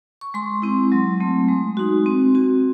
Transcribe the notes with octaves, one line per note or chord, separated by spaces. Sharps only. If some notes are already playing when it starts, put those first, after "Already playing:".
C#6
G#3 C6
C4 E4
F#3
A3 C4
G#3
D#4 F#4
C4
F#4